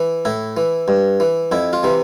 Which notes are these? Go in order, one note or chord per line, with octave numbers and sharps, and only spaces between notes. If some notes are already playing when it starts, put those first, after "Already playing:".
Already playing: E3
A2 E4
E3
G2
E3
F2 E4
F4
C3 E3